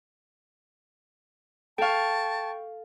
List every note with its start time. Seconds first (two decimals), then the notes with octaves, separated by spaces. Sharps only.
1.78 A4 F5 G5 A5 C#6